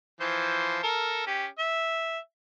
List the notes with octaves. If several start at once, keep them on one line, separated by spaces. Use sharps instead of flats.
E3 F3 C5
A4 A#4
C#4 G4
E5